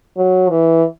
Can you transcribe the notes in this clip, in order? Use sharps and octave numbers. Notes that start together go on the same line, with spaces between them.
F#3
E3